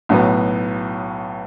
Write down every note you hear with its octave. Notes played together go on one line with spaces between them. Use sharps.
B1 A2 F#3 B3